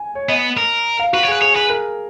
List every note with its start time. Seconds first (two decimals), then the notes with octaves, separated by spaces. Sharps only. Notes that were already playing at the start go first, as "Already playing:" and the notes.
Already playing: G#5
0.15 C#5
0.29 B3 D#5
0.57 A#4
0.99 F5
1.13 F#4 B4
1.23 C#5
1.28 G#4 B4
1.41 G#4 C#5
1.55 G#4 B4
1.70 A#4